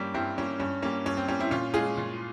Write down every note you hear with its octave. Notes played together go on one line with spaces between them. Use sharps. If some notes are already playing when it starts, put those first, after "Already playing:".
Already playing: G2 G3 A#3 C#4
G2 C4 E4
G3 A#3 C#4
G2 C#4
G3 A#3 C#4
G2 C#4
C4
G3 A#3 C#4
C4 E4
A#2 C#4 F4
G#3 F4 G#4
A#2